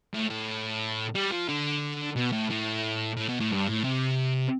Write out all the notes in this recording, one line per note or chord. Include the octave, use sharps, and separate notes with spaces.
A2
A2
G3
F3
D3
B2
A2
A2
A2
B2
A2
G2
A2
C3